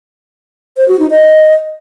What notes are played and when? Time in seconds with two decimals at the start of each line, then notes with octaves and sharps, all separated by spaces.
0.77 C5
0.88 F#4
0.99 D#4
1.10 D#5